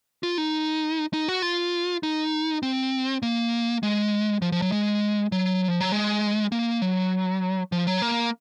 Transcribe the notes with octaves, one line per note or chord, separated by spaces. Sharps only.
F4
D#4
D#4
F#4
F4
D#4
C4
A#3
G#3
F3
F3
F#3
G#3
F#3
F3
F#3
G#3
A#3
F#3
F3
F#3
A#3